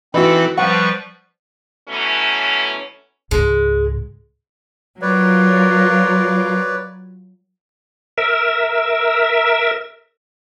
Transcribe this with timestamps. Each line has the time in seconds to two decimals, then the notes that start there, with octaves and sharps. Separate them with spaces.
0.14 E3 C4 D#4 F#4 A4 B4
0.58 F3 G3 B4 F#5 C#6
1.89 B2 E3 F#3 A3 C#4
3.31 C#2 G#2 G#3
5.02 F#3 F4 A#4 B4 C#5 D5
8.18 A#4 E5